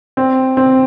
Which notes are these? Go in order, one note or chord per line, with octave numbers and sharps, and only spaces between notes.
C4
C4